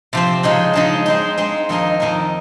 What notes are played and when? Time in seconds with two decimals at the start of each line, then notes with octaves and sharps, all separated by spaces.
0.13 C3 F3 C4
0.43 C#3 F3 G#3 D#4
0.73 C#3 F3 G#3 D#4
1.06 G#3 C4 D#4
1.38 G#3 C4 D#4
1.69 F2 D#3 A#3 D#4 A#4
2.00 F2 D#3 A#3 D#4 A#4